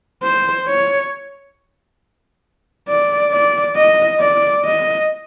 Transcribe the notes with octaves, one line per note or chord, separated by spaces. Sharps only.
C5
C#5
D5
D5
D#5
D5
D#5